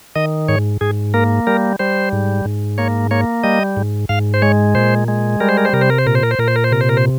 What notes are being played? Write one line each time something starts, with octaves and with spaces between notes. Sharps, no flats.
D#3 D#5
G#2 C#5
G#2 G#4
A#3 A#4
G3 A#4
G3 C5
G#2
G#2
A#3 C#5
A#3 C#5
G3 D#5
G#2
G#2 F5
C5
G#3 C#5
A#2 C5
G#3
G3 A#4
C5
A#4
C5
C3 A#4
C5
A#4
C5
A#2 A#4
C5
A#4
C5
A#2 A#4
C5
A#4
C5
C3 A#4
C5
A#4
C5